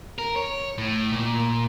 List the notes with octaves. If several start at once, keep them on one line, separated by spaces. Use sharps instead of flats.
A#4
C#5
A2
A#2